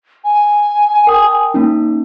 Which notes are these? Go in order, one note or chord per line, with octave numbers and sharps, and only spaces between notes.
G#5
A#4 G5 D#6
A#3 C#4 D#4